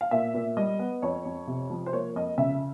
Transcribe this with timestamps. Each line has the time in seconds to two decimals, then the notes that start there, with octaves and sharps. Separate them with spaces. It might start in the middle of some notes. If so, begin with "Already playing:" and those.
0.01 F5
0.11 A#2 E5
0.34 A#2
0.57 G3 D#5
0.79 B3
1.02 F2 C#5
1.25 F2
1.47 C3
1.70 F3
1.86 C5
1.93 A#3 C#5
2.15 F2 D#5
2.38 C#3 E5